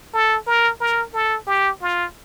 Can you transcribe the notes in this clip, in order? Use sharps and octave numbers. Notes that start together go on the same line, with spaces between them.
A4
A#4
A#4
A4
G4
F4